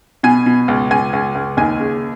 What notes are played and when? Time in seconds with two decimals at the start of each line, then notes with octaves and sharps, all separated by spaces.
0.23 B2 G#5
0.46 B2
0.68 C#2
0.91 C#2 G#5
1.13 C#2
1.35 C#2
1.57 D#2 G#5
1.80 C#3